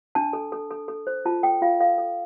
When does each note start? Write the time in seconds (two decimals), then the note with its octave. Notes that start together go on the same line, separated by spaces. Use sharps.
0.15 D4 A5
0.33 A4
0.52 A4
0.71 A4
0.88 A4
1.07 C5
1.25 F4 A5
1.43 A4 G5
1.62 F4 F5
1.80 A4 F5
1.98 A4